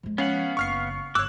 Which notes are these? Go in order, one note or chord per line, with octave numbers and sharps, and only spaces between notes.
F3 G#3
B3 C#4 F5 F#5
F#1 C4 C#6 F6 C7
G1 C#5 D6 E6 F#6